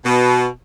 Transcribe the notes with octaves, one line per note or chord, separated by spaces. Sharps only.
B2